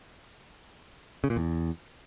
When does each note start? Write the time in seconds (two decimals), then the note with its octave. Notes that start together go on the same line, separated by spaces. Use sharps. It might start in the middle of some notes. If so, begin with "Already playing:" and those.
1.24 C#3
1.30 A#2
1.36 E2